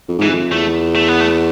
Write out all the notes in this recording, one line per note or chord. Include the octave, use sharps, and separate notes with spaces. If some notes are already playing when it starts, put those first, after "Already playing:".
F2
G#2 E3
F2
E2 A3
A3
B3
A3